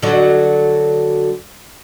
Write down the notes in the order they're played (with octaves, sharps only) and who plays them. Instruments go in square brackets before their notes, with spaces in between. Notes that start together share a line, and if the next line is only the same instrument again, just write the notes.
[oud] D3 F#3